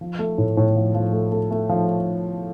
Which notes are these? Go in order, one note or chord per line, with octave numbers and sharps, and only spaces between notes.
F3
A3
A2
A2
F3
F3
A3
A3
A3
F3